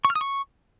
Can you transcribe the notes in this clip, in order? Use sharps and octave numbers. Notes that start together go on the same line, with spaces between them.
C#6
F6
D#6
C#6